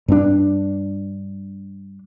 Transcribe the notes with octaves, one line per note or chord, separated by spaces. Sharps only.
G2 C4 D4